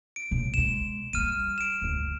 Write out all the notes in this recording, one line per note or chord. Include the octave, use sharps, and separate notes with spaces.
D7
B1 E2
B2 G#3 E7
E3 G3 F6 D#7
D7 E7
G1 D2